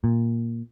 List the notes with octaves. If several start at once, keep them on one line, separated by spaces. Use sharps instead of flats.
A#2